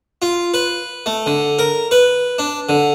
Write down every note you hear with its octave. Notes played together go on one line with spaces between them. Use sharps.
F4
B4
A3
D3
A#4
B4
D4
D3